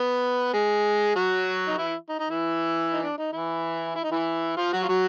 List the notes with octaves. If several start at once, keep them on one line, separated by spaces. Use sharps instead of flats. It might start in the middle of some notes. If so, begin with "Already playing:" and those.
Already playing: B3 B4
G#3 G#4
F#3 F#4
D#4
E3 E4
D#4
D#4
E3 E4
D#4
D4
D#4
E3 E4
E4
D#4
E3 E4
F3 F4
F#3 F#4
F4
F#3 F#4